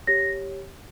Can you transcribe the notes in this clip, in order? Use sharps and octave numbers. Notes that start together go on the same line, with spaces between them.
G4 C#5 A#6